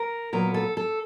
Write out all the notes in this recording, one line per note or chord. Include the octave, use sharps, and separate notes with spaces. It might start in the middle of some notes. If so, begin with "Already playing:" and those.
Already playing: A#4
A#2 F#3 B3 A#4
A4
A4